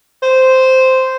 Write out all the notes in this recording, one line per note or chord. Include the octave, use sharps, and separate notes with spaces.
C5